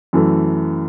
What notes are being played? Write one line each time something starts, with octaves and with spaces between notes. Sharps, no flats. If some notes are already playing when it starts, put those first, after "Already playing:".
F#2 E3 A3